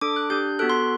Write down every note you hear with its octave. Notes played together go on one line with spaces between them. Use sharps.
D4 A4 D6
F#6
D4 G4 G6
B3 F#4 A4 F#6
C6